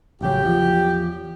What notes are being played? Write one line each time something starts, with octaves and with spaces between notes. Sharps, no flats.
A1 C#3 F#3 G4
E2 F3